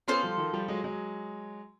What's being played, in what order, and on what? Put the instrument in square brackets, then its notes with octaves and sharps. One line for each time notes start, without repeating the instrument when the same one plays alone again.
[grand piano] B3 C#4 [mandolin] F4 A4 C5
[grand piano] F3 G3
D#3 F3
F3 G3
F#3 G#3
F#3 G#3